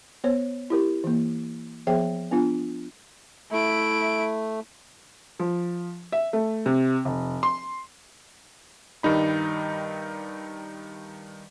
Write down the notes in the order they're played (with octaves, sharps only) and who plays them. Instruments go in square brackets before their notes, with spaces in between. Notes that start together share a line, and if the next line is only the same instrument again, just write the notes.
[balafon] B3 C5 C#5
E4 G4 A#4
E3 A#3
F3 B3 G#4 C5 E5 G5
B3 D4 F4 G#5
[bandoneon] A3 [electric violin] E4 D7
[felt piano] F3
E5
A3
C3
F1
C6
[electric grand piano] G2 D#3 G3 D#4 B5